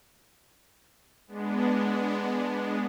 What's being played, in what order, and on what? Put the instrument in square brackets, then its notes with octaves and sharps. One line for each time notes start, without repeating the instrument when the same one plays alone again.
[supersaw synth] G#3 B3 D4